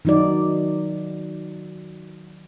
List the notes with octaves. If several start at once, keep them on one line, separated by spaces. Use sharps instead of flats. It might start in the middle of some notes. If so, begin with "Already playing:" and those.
D#3 F#3 D#4 F#4 D5